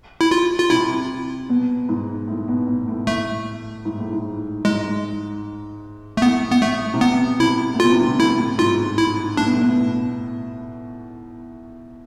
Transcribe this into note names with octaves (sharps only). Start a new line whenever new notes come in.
E4
F4
F4
C3 E4
B2
G#2
A2
B2
B2
A2
A2 A3
G#2
A2
G#2
G#2 G#3
A3
A2 B3
B3
A3
C3
B2 B3
C3 E4
A2
B2 F4
C3
D3
A2 E4
A2
G#2 F4
E4
A2 D4
B2
A2
B2
A2